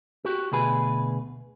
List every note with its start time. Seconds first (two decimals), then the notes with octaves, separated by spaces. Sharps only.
0.25 F#4 G4
0.52 D2 B2 G#4 B4 G#5